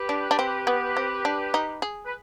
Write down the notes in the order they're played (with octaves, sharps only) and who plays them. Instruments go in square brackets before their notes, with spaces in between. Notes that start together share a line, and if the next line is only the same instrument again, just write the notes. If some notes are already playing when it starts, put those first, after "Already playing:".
Already playing: [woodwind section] G4 B4
[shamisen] D4
D4
C4
B3
C4
D4
D#4
G#4
[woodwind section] B4